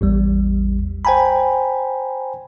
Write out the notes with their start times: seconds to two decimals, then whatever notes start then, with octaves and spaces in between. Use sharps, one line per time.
0.01 A1 E2 G3
1.05 C5 G5 G#5 A#5 B5